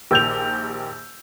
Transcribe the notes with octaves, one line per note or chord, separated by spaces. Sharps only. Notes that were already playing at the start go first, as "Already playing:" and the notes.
A#1 D#3 G4 E6 G6 F7